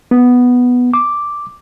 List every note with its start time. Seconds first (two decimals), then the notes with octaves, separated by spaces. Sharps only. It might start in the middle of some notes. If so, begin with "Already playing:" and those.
0.11 B3
0.94 D6